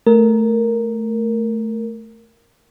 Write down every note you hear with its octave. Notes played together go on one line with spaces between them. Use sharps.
A3 A#4